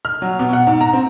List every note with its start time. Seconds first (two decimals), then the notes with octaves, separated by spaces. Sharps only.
0.05 F6
0.22 F#3
0.39 B2
0.53 F#5
0.67 G#2
0.81 A#5
0.93 C4